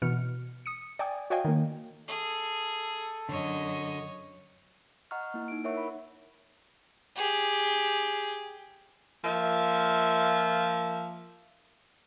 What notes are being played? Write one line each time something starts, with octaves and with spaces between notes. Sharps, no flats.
B2 E3 F6 C#7
D#6 C#7
D5 G5 G#5 D#6
F#4 C#5 D#5 F5 G5 G#5
D#3 A#3
G#4 A4
F#2 D3 C#5 D#5
D#5 F#5 A#5 C#6 F6
A#3 E4
D#4 D7
E4 A#4 C#5 E5 F#5 C#6
B5
G4 G#4
F3 A#3 E5